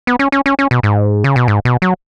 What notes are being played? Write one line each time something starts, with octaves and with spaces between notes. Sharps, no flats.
B3
C#4
C#4
C#4
C#4
B2
G#2
C#3
B2
G#2
B2
F#3